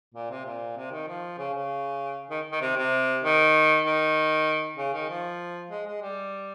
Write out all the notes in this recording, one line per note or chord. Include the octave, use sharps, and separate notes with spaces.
A#2
C3
A#2
C3
D#3
F3
C#3
C#3
D#3
D#3
C3
C3
D#3
D#3
C#3
D#3
F3
G#3
G#3
G3